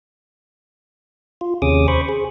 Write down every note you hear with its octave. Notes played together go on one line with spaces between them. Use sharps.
F4
D#2 C3 C#4 G#4 D6 D#6
C5 B5 C#6
G#4